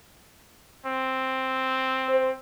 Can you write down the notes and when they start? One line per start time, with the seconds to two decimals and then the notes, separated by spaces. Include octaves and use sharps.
0.86 C4
2.09 C5